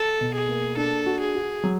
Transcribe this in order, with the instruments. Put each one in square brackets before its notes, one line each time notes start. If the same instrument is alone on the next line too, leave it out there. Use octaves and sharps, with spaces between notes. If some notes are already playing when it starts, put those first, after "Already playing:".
Already playing: [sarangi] A4
[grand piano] B2
[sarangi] G#4
[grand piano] A#3
[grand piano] D4 [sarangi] A4
[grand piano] F#4
[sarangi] G#4
[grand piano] F#4
F#3